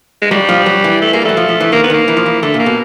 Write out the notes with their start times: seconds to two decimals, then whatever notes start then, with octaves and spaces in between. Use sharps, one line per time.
0.22 G#3
0.31 F#3 G3
0.49 F3
0.66 F#3
0.84 E3
1.02 A3
1.13 G#3 A#3
1.22 G3
1.25 F#3 A3
1.37 F3
1.49 F3
1.60 E3
1.72 D#3 A#3
1.83 B3
1.90 D#3 A#3
2.08 E3
2.17 F3
2.26 E3
2.42 D3 A3
2.54 A#2
2.59 A#3
2.66 B2